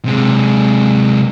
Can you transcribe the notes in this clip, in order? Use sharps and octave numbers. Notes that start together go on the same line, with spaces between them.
C3 G#3